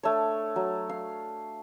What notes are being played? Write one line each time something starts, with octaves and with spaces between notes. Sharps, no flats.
A3 D4 C#5
F#3
F5